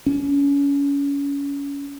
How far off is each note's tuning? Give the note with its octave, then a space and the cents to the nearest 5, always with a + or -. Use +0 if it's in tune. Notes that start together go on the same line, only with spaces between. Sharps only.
C#4 +30